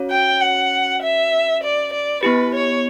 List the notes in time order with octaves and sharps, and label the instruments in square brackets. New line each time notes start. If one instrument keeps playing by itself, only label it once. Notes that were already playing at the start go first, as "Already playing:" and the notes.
Already playing: [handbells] C#4 F#4 C#5
[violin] G5
F#5
E5
D5
D5
[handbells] B3 E4 G4 [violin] B4
[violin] C#5